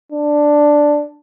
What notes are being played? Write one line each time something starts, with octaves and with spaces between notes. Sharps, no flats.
D4